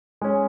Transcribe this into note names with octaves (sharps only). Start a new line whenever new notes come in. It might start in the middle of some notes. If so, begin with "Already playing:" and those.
G#3 C#4